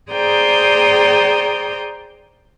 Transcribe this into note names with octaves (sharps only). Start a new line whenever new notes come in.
G#4 C5 D5 G5 A#5 D#6